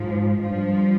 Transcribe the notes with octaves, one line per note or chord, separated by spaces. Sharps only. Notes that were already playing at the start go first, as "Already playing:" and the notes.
Already playing: G#2 F3
G2 F3